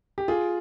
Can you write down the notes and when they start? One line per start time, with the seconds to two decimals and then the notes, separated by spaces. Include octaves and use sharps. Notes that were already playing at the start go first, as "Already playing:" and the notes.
0.18 G4
0.28 F4 G#4